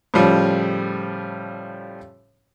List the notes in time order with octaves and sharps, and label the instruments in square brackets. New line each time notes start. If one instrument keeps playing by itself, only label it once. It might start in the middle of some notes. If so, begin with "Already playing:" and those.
[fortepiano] A2 C#3 F3 G3